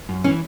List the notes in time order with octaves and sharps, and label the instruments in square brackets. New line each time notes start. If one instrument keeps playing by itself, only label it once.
[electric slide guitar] F#2
[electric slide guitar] E3 [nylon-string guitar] C#4